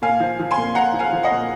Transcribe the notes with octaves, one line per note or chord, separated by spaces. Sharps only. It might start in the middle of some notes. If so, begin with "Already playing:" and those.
A#2 F5 G#5
F3
F3
G#5 C6
A#2
A#2 F#5 A#5
F3
F5 G#5
F3
D#5 F#5
A#2